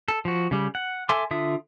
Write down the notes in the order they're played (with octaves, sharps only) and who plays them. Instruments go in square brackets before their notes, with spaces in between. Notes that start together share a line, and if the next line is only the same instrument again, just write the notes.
[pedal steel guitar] A4
F3 F#4
C#3 G3
F#5
A4 E5 G#5 C6 D6
D3 F4 E5 D#6